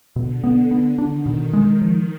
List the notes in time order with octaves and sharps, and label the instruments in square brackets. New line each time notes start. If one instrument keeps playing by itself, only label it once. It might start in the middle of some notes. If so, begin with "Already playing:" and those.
[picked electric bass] B2 [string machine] D3
[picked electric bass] B3
B3
[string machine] D#3 [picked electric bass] D4
[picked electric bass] B2
G#3
[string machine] D#3 [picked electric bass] F3